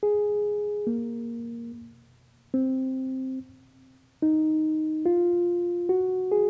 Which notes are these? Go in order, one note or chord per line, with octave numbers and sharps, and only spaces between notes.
G#4
A#3
C4
D#4
F4
F#4
G#4